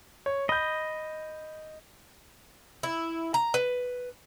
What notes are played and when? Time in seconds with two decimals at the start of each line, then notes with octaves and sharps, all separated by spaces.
0.26 C#5
0.49 D#5 B5 G6
2.83 E4
3.34 A#5
3.54 B4